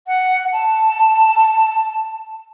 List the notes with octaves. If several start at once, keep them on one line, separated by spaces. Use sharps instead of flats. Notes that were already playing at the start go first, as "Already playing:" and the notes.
F#5
A5